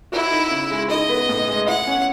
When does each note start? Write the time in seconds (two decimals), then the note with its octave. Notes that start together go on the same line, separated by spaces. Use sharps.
0.12 E4 F#4
0.31 D#4
0.51 C#3
0.71 G#3
0.90 D#4 D#5
1.09 B3
1.29 A2
1.48 G#3
1.67 E4 F#5
1.87 C#4